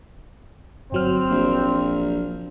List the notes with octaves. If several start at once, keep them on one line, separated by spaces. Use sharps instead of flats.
G1 F#3 C4 F6
A#1